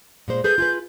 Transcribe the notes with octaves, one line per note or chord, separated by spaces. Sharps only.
A#2 G#3 C5
G#4 A4 B4 G6
F4 G#4 B4